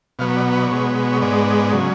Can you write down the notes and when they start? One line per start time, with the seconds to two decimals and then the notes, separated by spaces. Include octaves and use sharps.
0.19 B2 F#3 B3 F5
0.37 D5
0.53 B4
0.63 D5
0.71 B2 G#3 B3 C#5
1.12 C#5
1.21 G#2 G#3 B3 D5
1.73 C#3 F#3